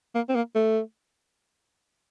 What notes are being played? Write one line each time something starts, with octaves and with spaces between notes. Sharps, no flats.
A#3
C4
A#3
A3